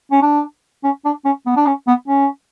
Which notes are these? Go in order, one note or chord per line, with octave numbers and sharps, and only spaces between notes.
C#4
D4
C#4
D4
C#4
B3
D4
C#4
B3
C#4